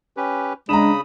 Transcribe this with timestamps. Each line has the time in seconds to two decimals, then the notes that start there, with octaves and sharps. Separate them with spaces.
0.17 C#4 G4 B4
0.69 C#3 G#3 D4 A#5 B5 D#6 E7